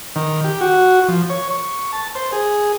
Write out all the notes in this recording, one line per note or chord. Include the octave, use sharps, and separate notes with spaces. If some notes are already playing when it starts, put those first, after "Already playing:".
D#3
G4
F#4
F3
C#5
C#6
A5
C5
G#4